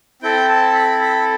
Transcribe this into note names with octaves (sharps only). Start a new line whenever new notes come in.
C4 E4 A4 G5
A5
B5
B5